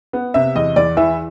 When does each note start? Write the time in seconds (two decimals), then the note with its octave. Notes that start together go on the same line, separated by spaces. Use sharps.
0.13 B3
0.34 C3 E5
0.55 E2 D#5
0.76 E2 D5
0.97 E3 E5